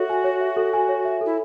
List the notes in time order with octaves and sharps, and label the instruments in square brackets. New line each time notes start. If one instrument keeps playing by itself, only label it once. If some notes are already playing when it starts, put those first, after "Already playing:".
Already playing: [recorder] F#4 [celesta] A4 C#5 E5
[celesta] G#5
C#5
E5
A4
G#5
C#5
E5
[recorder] E4 [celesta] A4